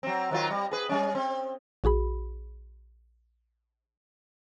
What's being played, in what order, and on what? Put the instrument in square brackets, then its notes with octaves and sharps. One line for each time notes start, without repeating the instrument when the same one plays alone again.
[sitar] F#3 C4
D#3 F#3 F4
G3
G#4 B4
G3 C#4
C4
[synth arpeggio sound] A#1 F#4 G#4 B5